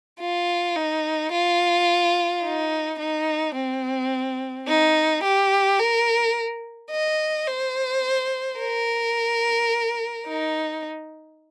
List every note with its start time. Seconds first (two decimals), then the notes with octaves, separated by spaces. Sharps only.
0.20 F4
0.76 D#4
1.32 F4
2.43 D#4
2.99 D#4
3.56 C4
4.68 D#4
5.24 G4
5.79 A#4
6.91 D#5
7.47 C5
8.59 A#4
10.27 D#4